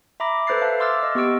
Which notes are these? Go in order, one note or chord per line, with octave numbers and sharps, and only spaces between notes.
E5 A#5 B5 D6 A#6
A4 B4 C5 F#6 A6 C7
E5 F5 A5
C6 D6 E6 F6 A6
D#5
B3 G4 C#6 E6 D7